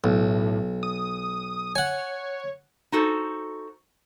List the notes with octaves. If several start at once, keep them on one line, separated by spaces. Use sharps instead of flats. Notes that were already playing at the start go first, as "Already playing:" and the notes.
B1 A2
D#6
C#5 F#5 G#5
D#4 F#4 A4 C5